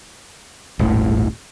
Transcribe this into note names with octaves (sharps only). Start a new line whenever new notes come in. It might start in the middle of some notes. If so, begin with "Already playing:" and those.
D#1 G#1 A2